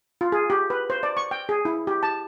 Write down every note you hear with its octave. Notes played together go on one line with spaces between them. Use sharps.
F4
G#4
G4
B4
C5
D5
C#6
G5
G#4
E4
G4
A5